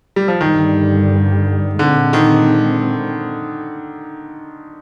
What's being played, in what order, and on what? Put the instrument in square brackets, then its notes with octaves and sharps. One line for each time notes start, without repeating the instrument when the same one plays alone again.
[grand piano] G3
F3
[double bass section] G2 D3 G3 [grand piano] D#3
[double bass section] A#2 G#3 C4 [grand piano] D3
[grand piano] D#3